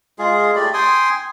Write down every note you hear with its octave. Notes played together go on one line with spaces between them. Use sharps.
G#3 F4 G#4
A3 G4 D5 B5
G5 G#5 C6 D#6